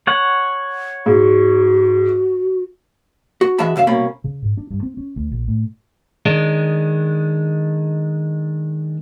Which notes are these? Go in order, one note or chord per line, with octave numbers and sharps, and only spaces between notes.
C#5 F#5
G#2 F#4
F#4
E3 G#3 F#4 E5 A5 B5
F#2 C#3 E5 F5
C2 B2 A#3 C#4 B5
C#3
G#2
D4
G2
C4
C#4
D2
A#1
A2
D#3 G#3 D4